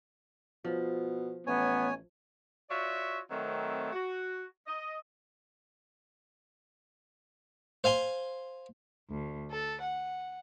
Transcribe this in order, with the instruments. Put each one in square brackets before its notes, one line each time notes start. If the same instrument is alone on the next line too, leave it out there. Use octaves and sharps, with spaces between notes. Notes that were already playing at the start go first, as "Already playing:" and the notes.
[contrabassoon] B2 [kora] F3
[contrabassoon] A1 [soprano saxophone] B3 [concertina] C#5 G#5
[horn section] F4 F#4 C#5 D5 E5
D#3 F#3 A3 C4
F#4
D#5
[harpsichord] C5 F5 G#5 C6
[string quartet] D2
A4
F#5